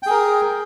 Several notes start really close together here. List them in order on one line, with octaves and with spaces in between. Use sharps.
G5 G#4 A#4